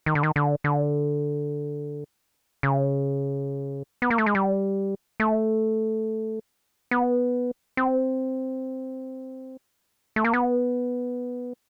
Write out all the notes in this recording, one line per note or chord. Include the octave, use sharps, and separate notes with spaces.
D#3
D3
D#3
D3
D3
C#3
B3
A#3
A3
G#3
G3
A3
B3
C4
A3
A#3
B3